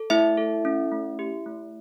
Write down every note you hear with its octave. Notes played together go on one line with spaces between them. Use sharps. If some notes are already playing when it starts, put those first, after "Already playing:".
Already playing: A4
A3 E4 E5
A4
C#4
A3
G4
A3